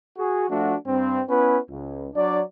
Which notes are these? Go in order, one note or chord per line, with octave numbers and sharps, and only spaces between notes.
F#4 G#4
F3 A3 D4 F#4
G2 C4
B3 C#4 E4 B4
C#2
F#3 D4 D5